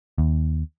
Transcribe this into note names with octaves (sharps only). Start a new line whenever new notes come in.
D#2